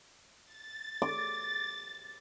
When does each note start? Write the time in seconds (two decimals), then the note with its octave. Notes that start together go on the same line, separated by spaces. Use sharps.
0.44 A6
1.02 D6